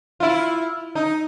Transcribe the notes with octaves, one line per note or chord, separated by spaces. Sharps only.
E4 F4
D#4